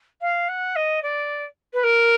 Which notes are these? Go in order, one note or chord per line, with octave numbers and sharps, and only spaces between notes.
F5
F#5
D#5
D5
B4
A#4